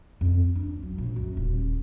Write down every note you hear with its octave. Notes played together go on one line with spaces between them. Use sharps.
F2
D4
F#3
A#1
F#2
D#1